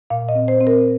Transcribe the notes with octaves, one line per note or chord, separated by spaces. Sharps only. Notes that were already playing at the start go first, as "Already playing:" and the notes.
A#2 F5
D#5
C4
C5
C4
A#4